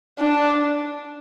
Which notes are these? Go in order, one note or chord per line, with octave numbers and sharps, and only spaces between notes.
D4